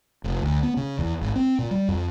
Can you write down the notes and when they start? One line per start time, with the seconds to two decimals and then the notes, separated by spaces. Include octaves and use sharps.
0.24 F1
0.42 D2
0.63 B3
0.77 C#3
0.99 E2
1.22 G#1
1.36 C4
1.59 A#2
1.71 G3
1.88 F2